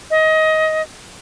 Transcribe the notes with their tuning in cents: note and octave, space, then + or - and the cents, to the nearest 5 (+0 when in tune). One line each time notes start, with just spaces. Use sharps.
D#5 +20